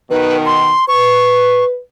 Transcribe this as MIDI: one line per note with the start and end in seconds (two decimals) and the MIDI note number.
0.11 0.71 47
0.11 0.71 51
0.11 0.37 71
0.46 0.87 84
0.88 1.78 71
0.88 1.65 85